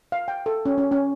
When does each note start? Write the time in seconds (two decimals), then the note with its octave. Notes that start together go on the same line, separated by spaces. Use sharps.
0.12 F5
0.28 G5
0.46 A4
0.66 C#4
0.78 C#4
0.92 C#4